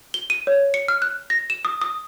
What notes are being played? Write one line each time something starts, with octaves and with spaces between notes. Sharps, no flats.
G7
D#7
C#5
C#7
F6
F#6
A#6
E7
D#6
D#6